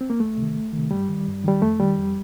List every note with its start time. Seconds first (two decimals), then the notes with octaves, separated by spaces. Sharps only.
0.01 C4
0.10 A#3
0.20 D2 A3
0.38 C3 D#3
0.56 D2
0.73 C3 D#3
0.91 G2 G3
1.09 D#3
1.27 G2
1.44 D#3 G3
1.62 F2 A3
1.80 D#3 G3
1.97 F2